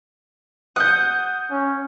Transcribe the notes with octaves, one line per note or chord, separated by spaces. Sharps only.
F#5 D#6 G6
C#4